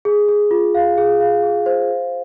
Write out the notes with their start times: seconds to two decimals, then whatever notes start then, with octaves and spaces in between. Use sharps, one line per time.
0.05 G#4
0.28 G#4
0.51 F4
0.75 F5
0.98 G#4
1.20 F5
1.43 G#4
1.66 C5
1.88 F5